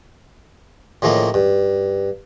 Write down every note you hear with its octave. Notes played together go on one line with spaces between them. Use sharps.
A2 C#3 F3 A#3 D#5
G2